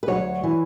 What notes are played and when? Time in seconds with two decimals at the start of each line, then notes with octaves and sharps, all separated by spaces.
0.03 B4
0.08 C#3 F#3 C#5
0.12 D2
0.43 E3